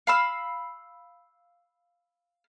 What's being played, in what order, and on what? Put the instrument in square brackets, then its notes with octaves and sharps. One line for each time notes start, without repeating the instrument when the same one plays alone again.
[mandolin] F5 B5 E6